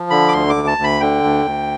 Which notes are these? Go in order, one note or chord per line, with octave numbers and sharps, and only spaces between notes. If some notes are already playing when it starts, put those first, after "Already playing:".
Already playing: F3
D3 B5
D6
D2 C6
D6
D2
A5
D2
B5
D3 G5
D2
D2